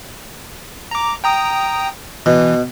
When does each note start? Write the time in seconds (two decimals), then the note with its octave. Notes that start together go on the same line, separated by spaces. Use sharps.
0.91 A#5 D6
1.24 G5 A#5 D#6
2.26 B2 E3